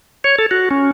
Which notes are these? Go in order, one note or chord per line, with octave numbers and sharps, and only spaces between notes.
C#5
A4
F#4
C#4